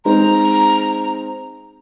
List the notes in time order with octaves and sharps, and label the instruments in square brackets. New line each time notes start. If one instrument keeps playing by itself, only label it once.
[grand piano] G#3 C4 D#4 C5 [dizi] A#5